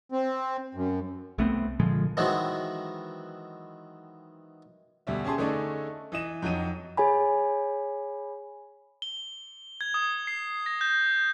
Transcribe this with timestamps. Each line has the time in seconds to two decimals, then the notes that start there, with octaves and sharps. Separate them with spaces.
0.12 C4
0.75 F#2
1.38 C2 A3 B3 C4
1.79 A#2 D3 F3 G#3
2.17 D#3 E3 F#3 G#3 B3 C4
5.07 D2 B2 G3 E5
5.24 C#4 G4 G#4 A5 C6
5.38 D3 A3 C#4 D#4 G#4 D5
6.12 E3 D#5 E7
6.42 F2 F#3 D#4 D#7
6.97 G#4 C#5 G#5 B5
9.02 G7
9.81 G#6
9.94 D#6
10.27 C7
10.66 A#6
10.81 G6